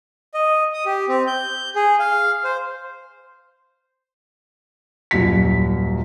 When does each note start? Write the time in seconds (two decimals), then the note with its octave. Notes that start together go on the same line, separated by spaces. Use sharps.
0.34 D#5
0.74 D#6
0.86 G4
1.08 C4
1.27 G6
1.76 G#4
2.00 F5
2.44 C5
5.11 D#1 F#2 B6